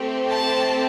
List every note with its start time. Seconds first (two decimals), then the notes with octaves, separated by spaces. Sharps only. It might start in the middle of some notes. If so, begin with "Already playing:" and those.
Already playing: A3 C4 G4
0.30 A5